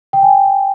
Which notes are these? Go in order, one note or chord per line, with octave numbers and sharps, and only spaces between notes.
G5
G#5